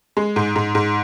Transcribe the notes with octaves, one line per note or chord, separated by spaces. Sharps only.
G#3
G#2
G#2
G#2